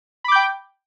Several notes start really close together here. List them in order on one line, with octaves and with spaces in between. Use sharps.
B5 D6 G6 G5